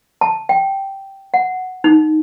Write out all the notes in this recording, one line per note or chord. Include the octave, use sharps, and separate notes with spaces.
A5
G5
F#5
D#4